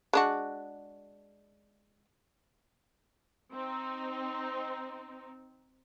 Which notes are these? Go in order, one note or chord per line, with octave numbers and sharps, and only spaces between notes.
G#3 D4 F#4
C4 D#4